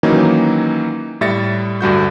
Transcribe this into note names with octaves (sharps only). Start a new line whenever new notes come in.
D#3 E3 F#3 A#3 C#4 D#4
A2 G3 E5 A6 A#6 C#7
D2 G2 F#4 G6